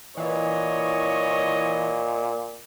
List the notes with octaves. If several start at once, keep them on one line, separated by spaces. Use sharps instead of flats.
A#2 E3 C#5 D#5